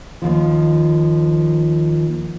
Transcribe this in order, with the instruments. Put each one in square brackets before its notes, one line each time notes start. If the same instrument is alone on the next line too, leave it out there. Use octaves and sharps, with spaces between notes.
[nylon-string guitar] D#2 F3